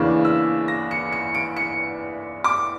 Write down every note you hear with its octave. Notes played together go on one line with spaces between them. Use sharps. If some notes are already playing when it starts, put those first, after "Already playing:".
Already playing: E2 C#3 E3 A#3 D4 C#6
E6
A#6
C#7
C#7
D7
C#7
D6